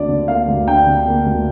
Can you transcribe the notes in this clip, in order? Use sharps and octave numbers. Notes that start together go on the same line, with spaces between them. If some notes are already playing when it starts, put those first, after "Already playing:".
Already playing: D2 A#3 D4 D5
D3
A#3 F5
D2
D4 G5
D3
A#3
D2